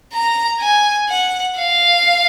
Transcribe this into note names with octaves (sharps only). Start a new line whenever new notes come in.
A#5
G#5
F#5
F5